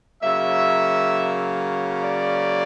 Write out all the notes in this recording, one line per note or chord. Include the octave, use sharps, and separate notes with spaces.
C#3 F#3 A#3 E5
D5